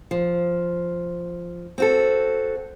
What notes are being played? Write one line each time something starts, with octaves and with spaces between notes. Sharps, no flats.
F3
C4 F#4 A4